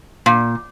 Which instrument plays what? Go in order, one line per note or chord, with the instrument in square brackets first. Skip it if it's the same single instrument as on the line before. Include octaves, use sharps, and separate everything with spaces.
[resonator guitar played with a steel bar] A#2